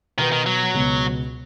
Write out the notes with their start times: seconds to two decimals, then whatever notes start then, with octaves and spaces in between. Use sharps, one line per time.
0.18 B2 D#3 B3 F#4 B4
0.32 D#3
0.46 F#3
0.74 C#2 B2 B3